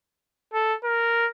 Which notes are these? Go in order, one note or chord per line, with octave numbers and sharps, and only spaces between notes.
A4
A#4